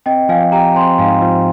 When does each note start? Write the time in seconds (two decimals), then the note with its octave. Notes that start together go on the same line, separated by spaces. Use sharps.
0.06 C4 D#5 G5
0.29 F3 F5 G#5
0.52 G4 G5 A#5
0.75 C4 G#5 C6
0.99 G#2 F5 G#5
1.22 F3